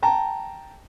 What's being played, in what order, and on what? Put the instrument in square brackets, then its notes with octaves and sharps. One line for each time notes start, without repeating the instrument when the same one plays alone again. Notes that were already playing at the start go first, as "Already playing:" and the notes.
[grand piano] G5 A5 A#5